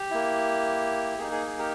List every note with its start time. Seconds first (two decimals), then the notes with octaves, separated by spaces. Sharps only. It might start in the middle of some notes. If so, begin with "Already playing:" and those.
Already playing: G4
0.11 A#3 E4
1.18 A#3 D#4 G#4
1.32 G#4
1.46 G#4
1.59 G4 A#4